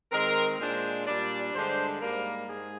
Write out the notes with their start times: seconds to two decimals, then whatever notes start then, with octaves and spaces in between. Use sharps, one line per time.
0.12 D#3 G#3 C4 A#4
0.59 A#2 G#3 D4 C5
1.07 A#2 G3 D4 D5
1.54 G2 D3 G#3 D4 C5
2.02 G#2 G3 A#3 A#4
2.48 G#2 G#4